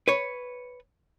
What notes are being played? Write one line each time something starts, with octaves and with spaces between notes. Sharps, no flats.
B4 C#5